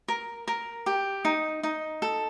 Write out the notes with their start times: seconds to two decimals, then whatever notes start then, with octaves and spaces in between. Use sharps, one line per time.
0.08 A#4
0.48 A#4
0.86 G4
1.25 D#4
1.63 D#4
2.02 A4